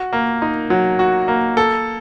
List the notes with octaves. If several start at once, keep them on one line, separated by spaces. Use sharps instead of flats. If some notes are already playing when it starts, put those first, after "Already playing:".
Already playing: F#4
A#3
D#4
F#3
F#4
A#3
A4